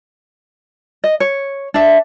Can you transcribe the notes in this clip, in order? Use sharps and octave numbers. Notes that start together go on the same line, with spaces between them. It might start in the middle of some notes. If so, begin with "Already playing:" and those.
D#5
C#5
D4 E5